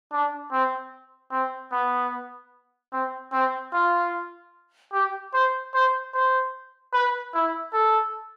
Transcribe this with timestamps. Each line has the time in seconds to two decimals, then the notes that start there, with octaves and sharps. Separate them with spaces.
0.12 D4
0.52 C4
1.31 C4
1.72 B3
2.93 C4
3.32 C4
3.73 F4
4.93 G4
5.33 C5
5.74 C5
6.14 C5
6.93 B4
7.34 E4
7.73 A4